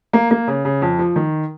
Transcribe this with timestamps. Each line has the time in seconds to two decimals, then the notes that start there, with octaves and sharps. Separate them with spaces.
0.13 A#3
0.31 A#3
0.48 C#3
0.65 C#3
0.82 F2
0.99 F3
1.16 D#3